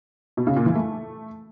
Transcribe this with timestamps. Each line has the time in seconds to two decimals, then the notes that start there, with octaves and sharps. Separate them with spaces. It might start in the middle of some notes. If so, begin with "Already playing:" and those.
0.37 B2
0.47 C#3
0.56 A#2
0.66 E3
0.75 A3